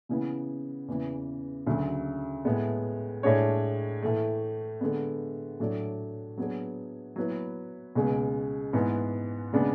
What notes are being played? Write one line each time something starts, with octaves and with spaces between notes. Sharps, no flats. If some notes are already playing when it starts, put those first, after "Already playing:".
C#3 E3 B3 E4
E2 C#3 E3
D2 C#3 F#3
A2 G#3 B3
A2 G#3 D4 G#4 C#5
A2 E3 A3
D3 G#3 B3
A2 F#3 A3 D4
F#3 B3 D4 G#4
F#3 B3 E4 B4
C#2 B2 G#3
G#2 E3 B3
C#3 G#3 B3 D4